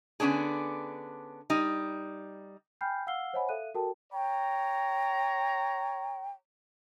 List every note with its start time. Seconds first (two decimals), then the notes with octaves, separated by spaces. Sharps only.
0.20 D3 B3 C#4 D4 G#4
1.50 G3 D#4
2.81 G5 G#5 B5 F6 G6 C7
3.07 F5 F#5 E6 F6 C7 G7
3.33 C5 C#5 D#5 F#5 G#5 B5
3.49 A4 E5 F5 F#6 D#7
3.74 F#4 A4 A#4 G5 A5
4.13 C#5 G5 A#5